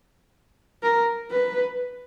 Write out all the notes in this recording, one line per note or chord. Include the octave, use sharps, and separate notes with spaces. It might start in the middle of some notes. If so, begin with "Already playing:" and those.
A#4
B4